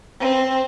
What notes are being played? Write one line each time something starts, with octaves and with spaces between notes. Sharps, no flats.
C4